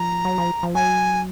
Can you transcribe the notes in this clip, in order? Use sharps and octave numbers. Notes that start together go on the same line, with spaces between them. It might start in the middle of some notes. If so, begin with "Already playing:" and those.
Already playing: F3 A#5
F#3
F3
F3
F#3 G#5